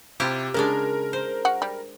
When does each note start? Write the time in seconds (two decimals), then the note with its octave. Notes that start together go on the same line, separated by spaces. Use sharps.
0.20 C3 E4 F4 G4
0.54 C#3 G#3 D4 A#4
1.13 C5
1.45 F#4
1.62 G3